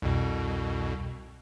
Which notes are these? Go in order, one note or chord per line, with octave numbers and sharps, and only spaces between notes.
C2 F2 B2